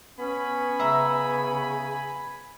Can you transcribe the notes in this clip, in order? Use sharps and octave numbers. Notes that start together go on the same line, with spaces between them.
B3 C#4 G#5 B5
C#3 E5 A#5